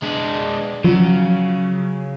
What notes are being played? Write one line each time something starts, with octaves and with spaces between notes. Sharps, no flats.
G#3 D4
C#3 F3 F#3